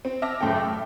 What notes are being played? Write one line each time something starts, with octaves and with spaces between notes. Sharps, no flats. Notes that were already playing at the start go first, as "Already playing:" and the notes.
C4
E5 A5 D6 F6 A#6
F#1 A2 C#4 A4 G5
E5